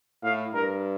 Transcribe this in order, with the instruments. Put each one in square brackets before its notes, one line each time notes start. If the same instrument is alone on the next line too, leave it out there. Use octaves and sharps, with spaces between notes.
[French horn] A2 [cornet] F5
[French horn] G2 [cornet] A#4